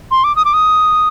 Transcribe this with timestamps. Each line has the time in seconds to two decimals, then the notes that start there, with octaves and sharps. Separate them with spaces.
0.11 C6
0.24 D6
0.36 D#6
0.45 D6
0.54 D#6